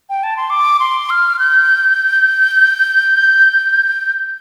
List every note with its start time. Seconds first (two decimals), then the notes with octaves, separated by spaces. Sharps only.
0.09 G5
0.23 A5
0.37 C6
0.50 D6
0.80 C6
1.10 F6
1.39 G6